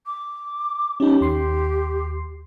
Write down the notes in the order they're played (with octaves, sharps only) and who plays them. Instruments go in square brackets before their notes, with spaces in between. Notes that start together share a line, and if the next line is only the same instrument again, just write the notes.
[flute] D6
[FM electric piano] C#4 D#4 [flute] G4
[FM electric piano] D#2 C6 C7